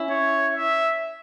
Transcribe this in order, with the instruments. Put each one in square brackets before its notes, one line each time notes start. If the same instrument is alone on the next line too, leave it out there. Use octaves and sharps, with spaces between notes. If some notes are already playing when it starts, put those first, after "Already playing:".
Already playing: [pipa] C#4 E4
[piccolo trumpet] C#5
E5